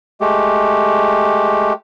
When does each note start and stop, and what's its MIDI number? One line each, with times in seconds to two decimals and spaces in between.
0.21 1.73 56
0.21 1.73 57
0.21 1.73 67